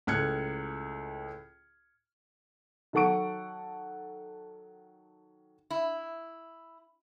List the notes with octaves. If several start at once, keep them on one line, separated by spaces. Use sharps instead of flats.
C#2 A2 F6 F#6 G#6 C#7
D#3 F#3 A4 F#5 C#6 D7
E4